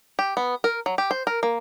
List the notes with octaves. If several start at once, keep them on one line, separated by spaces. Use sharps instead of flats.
G4
B3
A#4
F#3
G4
C5
A#4
A#3